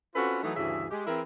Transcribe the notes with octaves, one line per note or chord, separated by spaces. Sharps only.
C4 C#4 F4 F#4 A4 B4
E3 F#3 A3 D#4
D2 G2 C#3 E3 G#4 E5
G#3 G4
E3 C4 E4 G#4 A#4